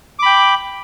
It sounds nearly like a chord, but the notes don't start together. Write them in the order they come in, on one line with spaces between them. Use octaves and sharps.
D6 B5 G5